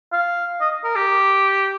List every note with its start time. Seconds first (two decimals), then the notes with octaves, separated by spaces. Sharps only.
0.13 F5
0.61 D#5
0.84 A#4
0.96 G4